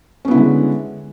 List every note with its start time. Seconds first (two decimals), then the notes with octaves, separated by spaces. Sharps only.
0.25 C#4
0.28 B3
0.31 E4
0.34 D3
0.37 G#3